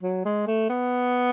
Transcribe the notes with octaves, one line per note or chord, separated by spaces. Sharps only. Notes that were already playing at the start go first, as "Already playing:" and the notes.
F#3
G#3
A3
B3